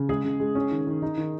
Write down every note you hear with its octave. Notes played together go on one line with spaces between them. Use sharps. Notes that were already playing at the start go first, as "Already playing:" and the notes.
Already playing: C#3
G#3 G#4
C#3
G#3
C#4
D#3
D#3
D#4
D#3